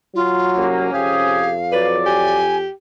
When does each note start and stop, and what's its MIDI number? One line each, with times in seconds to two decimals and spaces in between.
0.15 0.92 54
0.15 0.65 65
0.57 0.89 36
0.57 0.89 58
0.57 1.54 61
0.93 2.66 41
0.93 1.50 48
0.93 1.50 67
0.93 1.50 68
0.93 1.87 77
1.72 2.42 54
1.72 1.97 71
1.72 2.42 74
2.06 2.71 67
2.06 2.57 80